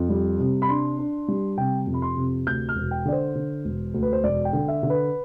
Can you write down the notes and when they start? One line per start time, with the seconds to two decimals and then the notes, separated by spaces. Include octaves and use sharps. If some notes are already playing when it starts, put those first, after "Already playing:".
Already playing: F2
0.09 G3
0.39 C3
0.62 B5
0.69 D4 C6
0.98 D4
1.28 G3
1.57 C3 G5
1.87 F2
1.94 B5
2.02 C6
2.16 C3
2.46 D2 G6
2.69 F6
2.76 E1
2.91 G5
3.05 D3 D5
3.12 C5
3.35 D3
3.65 E1
3.94 D2
4.03 B4
4.13 C5
4.23 E1 D5
4.45 G5
4.53 D3
4.68 E5
4.83 D3
4.90 B4